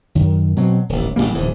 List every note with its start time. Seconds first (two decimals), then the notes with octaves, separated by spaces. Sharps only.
0.15 F#2 D#3
0.56 B2 F#3 A3 C4
0.89 D#1 A1
1.16 A1 D3 G3 A#3
1.34 D1 E2 G#2